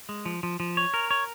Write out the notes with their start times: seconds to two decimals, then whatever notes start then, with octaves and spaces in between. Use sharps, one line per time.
0.09 G#3
0.26 F3
0.43 F3
0.60 F3
0.77 C#5
0.94 A#4
1.11 C#5